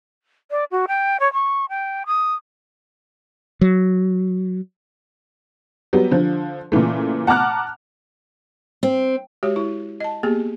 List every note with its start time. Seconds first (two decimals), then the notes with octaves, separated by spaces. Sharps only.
0.51 D5
0.71 F#4
0.88 G5
1.20 C#5
1.33 C#6
1.69 G5
2.06 D#6
3.61 F#3
5.93 F#3 G3 B3
6.11 D3 F3
6.72 A#2 C#3 E3 A3
7.27 F#5 A5 A#5 D6 F6 F#6
8.83 C4
9.43 G#3 F#4 G4 C#5
9.56 E4
10.00 D#5 A5
10.23 A#3 B3 G4 G#4